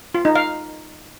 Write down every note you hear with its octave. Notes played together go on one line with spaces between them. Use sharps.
F4
D#4
F5